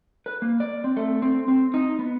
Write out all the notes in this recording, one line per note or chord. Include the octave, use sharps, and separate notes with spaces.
B4
A#3
D5
C4
A3
C4
C4
D#4
B3